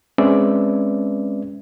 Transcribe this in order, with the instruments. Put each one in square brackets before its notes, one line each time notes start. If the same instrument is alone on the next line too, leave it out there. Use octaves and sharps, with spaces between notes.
[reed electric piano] G#3 C4 C#4 B4 D5 E5